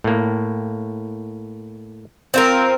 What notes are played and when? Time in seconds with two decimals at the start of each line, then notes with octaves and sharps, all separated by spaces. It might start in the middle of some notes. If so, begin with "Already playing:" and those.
0.04 A2 A#3
2.34 C4 F4 A#4